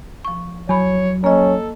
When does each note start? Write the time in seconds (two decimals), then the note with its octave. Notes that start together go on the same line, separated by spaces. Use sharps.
0.25 F3 C#6
0.69 E2 F#3 C#5 B5
1.24 A#3 C#4 A4 D#5